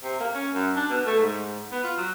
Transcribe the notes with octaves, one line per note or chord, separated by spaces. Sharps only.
C3
A#3
C#4
F#2
D4
B2
A3
G#2
B3
F4
F#3